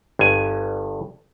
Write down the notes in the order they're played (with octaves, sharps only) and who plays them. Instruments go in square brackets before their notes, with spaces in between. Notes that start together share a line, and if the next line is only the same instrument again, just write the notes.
[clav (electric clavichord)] G1 G2 G#5